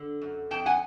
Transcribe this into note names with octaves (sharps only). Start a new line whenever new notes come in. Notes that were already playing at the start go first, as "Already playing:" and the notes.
Already playing: D3
F#2
F2 G5 A5
F#5 G#5